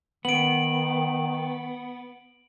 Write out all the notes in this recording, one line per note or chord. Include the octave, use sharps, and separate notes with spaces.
D#3 B3 D7 F#7